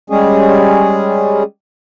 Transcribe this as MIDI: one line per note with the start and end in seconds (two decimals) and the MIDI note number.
0.10 1.43 55
0.10 1.43 56
0.10 1.43 61
0.10 1.43 68